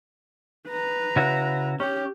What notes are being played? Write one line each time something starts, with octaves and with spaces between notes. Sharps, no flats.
B4 A#5
C#3 E4 F#4
C#4 G4